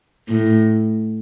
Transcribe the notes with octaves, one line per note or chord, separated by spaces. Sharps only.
A2